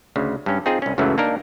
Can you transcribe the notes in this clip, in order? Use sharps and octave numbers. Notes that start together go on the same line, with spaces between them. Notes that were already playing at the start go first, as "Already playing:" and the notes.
D2 C#3
G2 C#4
C4 D#4 F4 G#4
C2 C#4
C#2 F#2 C#3 E3 F#3 A3
A#3 D4 D#4 A#4